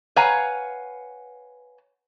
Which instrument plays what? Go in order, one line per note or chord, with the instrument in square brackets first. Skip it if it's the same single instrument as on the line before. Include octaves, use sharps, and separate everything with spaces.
[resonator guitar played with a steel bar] B4 C#5 F5 F#5 G#5 A#5